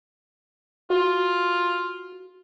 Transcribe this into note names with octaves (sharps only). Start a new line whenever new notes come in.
F4 F#4